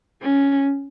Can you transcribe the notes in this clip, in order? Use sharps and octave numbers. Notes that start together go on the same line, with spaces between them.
C#4